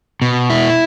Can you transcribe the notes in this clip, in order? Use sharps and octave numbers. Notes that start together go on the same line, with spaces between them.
B2
E4